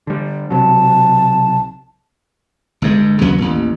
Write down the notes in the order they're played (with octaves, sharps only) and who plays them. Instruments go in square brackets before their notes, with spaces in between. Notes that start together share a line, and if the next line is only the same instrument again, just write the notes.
[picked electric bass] D3 G3
[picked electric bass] B1 C3 F#3 [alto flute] A5
[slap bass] G1 G2 G#3
D#2 C#3 F#3 B3
A1 D#2